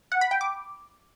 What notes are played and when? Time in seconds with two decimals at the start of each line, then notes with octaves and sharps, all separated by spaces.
0.12 F#5
0.21 B5
0.31 G5
0.41 D6